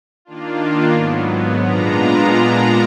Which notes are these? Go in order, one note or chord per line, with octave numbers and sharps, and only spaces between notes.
D#3 A#3 D4 F4
G#2 F#3 B3
A#2 G#3 B3 D4 F4 A#5